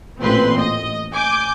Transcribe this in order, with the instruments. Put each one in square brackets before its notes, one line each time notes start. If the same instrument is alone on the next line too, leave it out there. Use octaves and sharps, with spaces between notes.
[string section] A1 A#2 C4 B4 C6
D#5
G#5 D6 G6